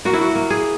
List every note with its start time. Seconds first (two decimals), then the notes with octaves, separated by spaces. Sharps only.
0.05 A#3 F#4
0.13 E4
0.21 F#4
0.35 A#3
0.50 G#4